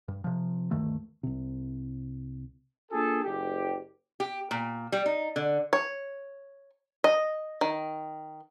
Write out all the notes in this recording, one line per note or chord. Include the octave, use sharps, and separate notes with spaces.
G2
C3 F3
D2 G2 D#3 A3
C2 C3
A#3 D4 F4 G#4 A4
F#1 G4
G4
A#2
G3
D#4
D3
C#5
D#5
D#3